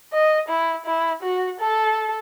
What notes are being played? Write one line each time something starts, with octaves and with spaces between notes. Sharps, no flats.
D#5
E4
E4
F#4
A4